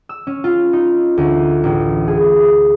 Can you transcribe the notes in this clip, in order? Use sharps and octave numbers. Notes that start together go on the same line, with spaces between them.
E6
C#4
F4
D#4
D2
A1
G#4